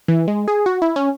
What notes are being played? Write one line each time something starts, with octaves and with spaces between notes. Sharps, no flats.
E3
G#3
G#4
F#4
E4
C#4